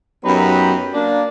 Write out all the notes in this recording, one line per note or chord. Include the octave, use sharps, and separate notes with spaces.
F#2 F#3 B3 D#4 G4 B5
A#3 D4